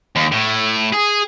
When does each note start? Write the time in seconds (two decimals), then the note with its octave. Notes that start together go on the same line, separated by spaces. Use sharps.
0.16 D#2
0.32 A2
0.93 G#4